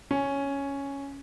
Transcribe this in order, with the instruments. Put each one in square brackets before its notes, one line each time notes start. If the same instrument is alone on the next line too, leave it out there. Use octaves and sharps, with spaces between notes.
[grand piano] C#4